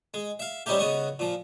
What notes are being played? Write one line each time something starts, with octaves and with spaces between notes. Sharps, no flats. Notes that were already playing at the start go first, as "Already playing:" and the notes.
G#3
E5 F5
G3 C4 C#4 D#4 E4 G4
C#3 B3 F#4 D#5 C#6 D#6
A#2 F3